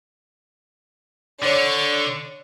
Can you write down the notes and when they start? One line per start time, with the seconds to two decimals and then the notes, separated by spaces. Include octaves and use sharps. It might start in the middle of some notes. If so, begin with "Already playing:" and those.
1.43 D3 C#5 D5 C#6